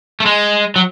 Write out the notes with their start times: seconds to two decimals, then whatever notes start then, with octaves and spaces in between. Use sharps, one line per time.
0.20 A3
0.26 G#3
0.76 F#3